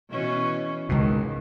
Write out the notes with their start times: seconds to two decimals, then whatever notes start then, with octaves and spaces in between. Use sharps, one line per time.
0.10 B2 E3 C#4
0.89 C#2 G#2 B2 D#3